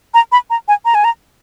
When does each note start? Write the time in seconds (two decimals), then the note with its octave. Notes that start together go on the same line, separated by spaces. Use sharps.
0.14 A#5
0.32 B5
0.50 A#5
0.68 G#5
0.85 A#5
0.95 G#5
1.04 A#5